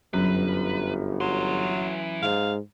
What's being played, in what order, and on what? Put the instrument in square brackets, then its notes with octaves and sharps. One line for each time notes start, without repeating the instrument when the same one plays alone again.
[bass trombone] G1 [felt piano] F#2 [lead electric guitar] B4
[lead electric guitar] E3 C6 [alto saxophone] F#3
[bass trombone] G#2 [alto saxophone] F5